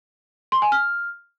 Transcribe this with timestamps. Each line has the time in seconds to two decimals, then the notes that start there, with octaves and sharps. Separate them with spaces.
0.52 C6
0.62 G#5
0.72 F6